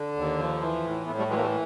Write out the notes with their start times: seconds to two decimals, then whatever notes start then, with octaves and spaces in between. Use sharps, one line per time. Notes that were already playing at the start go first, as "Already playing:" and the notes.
Already playing: D3
0.17 D#2
0.39 F3
0.61 E3
0.85 A2
1.06 A2 A3 B3
1.18 G3 A3
1.29 E3 F#3 G#3
1.36 A#3
1.41 G3 A3